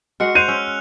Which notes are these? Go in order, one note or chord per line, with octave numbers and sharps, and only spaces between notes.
G#3 F#4 F#5 F6 C#7
C5 F#6 D#7 F7
C#4 E6